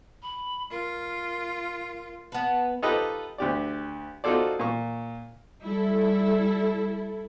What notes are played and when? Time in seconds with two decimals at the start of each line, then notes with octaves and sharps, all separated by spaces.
0.22 B5
0.71 F4 A#4
2.32 B3 B4 A5
2.83 D#4 F4 G4 A4 B4 D#5
3.38 D2 G4 D5
4.24 D#4 F4 F#4 A4 C5 D5
4.59 A#2 C#6
5.64 G3 E4 A4